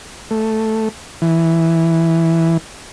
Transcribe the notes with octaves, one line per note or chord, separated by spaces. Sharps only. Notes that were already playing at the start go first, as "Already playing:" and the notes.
A3
E3